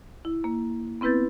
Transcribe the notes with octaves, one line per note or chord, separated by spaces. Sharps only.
E4
A#3
B3 C4 E4 B4 G6 A6